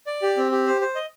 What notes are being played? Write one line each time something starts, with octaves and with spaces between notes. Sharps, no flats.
D5
G4
C4
G4
C5
C5
D#5